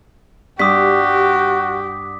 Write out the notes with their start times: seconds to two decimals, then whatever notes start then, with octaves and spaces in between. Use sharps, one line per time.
0.59 G2 F#4 G4 D6 D#6 B6